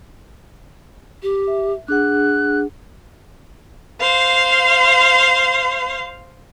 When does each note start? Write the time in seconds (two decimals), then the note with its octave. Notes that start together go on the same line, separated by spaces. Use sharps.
1.23 G4
1.47 E5
1.88 D4 G#4 F#5 F#6
4.01 C5 F5